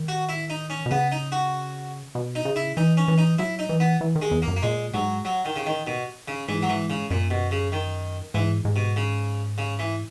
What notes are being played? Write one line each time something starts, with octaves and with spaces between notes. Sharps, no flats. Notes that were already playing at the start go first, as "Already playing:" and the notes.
Already playing: D#3
F#4
E4
D#4
C#4
B2
C#3 B3
D#4
F#4
B2
D#4
C#3
E4
E3 D#4
C#4
E3
D#4
F#3 E4
D#4
E3
B3
E3
D#3
G#3
E2
A#3
F#2
A#3
A#2 G#3
G#2 F#3
F#3
D#3
C#3
D#3
B2
C#3
G#2 E3
F#3
E3
C#3
F#2 A#2
B2
C#3
D#3
G#2 E3
G#2
B2
C#3
C#3
E3